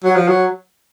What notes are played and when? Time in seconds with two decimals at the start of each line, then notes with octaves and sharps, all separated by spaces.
0.04 F#3
0.16 F3
0.28 F#3